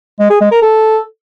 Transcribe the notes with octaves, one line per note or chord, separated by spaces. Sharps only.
G#3
G#4
G#3
A#4
A4